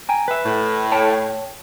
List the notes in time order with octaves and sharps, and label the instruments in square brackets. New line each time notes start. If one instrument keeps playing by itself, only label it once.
[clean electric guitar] G5 G#5 A#5
B4 E5
[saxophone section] A2
[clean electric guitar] C#5 G5 A5